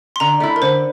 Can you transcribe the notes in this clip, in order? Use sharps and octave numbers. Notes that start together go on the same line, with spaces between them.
C6
D3 A#5
A3 E4
A#4
D3 C5